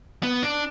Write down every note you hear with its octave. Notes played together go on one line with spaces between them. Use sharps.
B3
D4